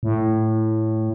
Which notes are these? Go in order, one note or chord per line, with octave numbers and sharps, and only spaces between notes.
A2